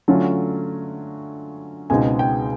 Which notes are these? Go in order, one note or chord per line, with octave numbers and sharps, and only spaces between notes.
D3 F#3 A3 C#4 F4
C#2 B2 G#3 C4 D#4 G#5
G5